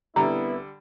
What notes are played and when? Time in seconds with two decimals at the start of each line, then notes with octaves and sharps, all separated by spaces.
0.16 C2 D3 G3 B3 E4 A#5